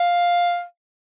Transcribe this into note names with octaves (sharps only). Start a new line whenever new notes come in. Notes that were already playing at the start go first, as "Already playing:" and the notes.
Already playing: F5